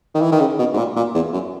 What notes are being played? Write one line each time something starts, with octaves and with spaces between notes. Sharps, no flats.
D#3
E3
D#3
C#3
B2
G#2
A#2
A#2
E2
F#2